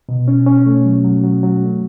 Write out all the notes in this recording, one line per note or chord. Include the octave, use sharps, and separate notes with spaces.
B2
C#4
C#4
A3
F#3
F#3
F#3
F#3
A3